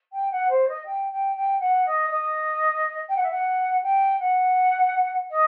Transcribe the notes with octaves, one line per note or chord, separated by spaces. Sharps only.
G5
F#5
C5
D#5
G5
G5
G5
F#5
D#5
D#5
G5
F#5
E5
F#5
G5
F#5
D#5